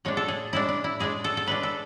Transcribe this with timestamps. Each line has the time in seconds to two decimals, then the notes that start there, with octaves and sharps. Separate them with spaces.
0.05 A2 G#3 D4 C#5
0.17 A4
0.28 G#4
0.53 A2 G#3 D4 E4
0.69 D4
0.84 E4
1.00 A2 G#3 D4 G#4
1.24 A4
1.37 A4
1.47 A2 G#3 D4 B4
1.63 A4